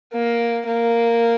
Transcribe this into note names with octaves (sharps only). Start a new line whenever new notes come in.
A#3
A#3